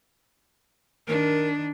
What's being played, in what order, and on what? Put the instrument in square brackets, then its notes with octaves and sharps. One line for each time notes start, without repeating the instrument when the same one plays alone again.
[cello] D#3 D4 [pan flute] A#4